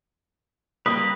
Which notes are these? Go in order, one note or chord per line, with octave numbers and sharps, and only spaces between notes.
G3 A#3 B4 D#6